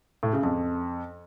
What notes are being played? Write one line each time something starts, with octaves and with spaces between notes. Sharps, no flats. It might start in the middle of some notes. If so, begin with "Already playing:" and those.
A2
C#3
F2